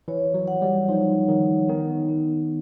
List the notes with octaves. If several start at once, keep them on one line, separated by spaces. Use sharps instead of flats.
E3 C#5
F#3
F#5
G3
F3 D#4
D#3 D#4
D#3 B3
B3